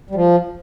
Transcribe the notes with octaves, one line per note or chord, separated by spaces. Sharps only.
G3
F3